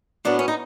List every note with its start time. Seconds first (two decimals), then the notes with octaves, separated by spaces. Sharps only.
0.25 A2 F#3 B3 D4
0.39 C#4
0.48 D#4